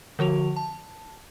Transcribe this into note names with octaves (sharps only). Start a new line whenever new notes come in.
D3 F3 F#4 F7
A5